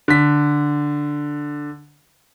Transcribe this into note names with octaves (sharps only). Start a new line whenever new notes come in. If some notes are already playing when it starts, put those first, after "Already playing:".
D3 B6